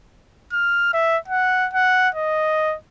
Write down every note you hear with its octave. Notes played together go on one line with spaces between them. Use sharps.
F6
E5
F#5
F#5
D#5